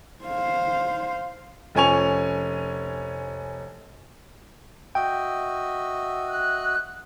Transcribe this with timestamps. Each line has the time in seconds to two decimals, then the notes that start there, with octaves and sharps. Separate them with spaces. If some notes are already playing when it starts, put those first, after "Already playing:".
0.25 C5 F5
1.75 F1 F3 C#4 G#5 C#6 F7
4.95 F#4 D#5 E5 G5
6.27 F#6